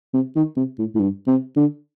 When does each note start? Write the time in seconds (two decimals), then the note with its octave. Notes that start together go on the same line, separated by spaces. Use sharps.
0.14 C3
0.36 D#3
0.57 C3
0.79 A2
0.95 A2
1.00 G2
1.27 C3
1.57 D3